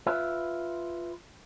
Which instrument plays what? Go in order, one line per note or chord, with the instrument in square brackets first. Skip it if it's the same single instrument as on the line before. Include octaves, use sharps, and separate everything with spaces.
[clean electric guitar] F4 B4 E5